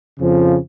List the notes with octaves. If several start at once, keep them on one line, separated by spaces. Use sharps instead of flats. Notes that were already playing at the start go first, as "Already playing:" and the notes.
F2 C#3 F3